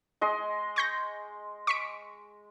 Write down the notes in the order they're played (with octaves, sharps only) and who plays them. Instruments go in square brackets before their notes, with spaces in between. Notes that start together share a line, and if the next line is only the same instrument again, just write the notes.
[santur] G#3 D#5 C6
[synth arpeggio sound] C#6 G6 A#6
C#6 B6 D7